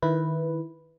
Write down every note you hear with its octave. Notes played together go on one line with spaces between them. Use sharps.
D#3 E4 B4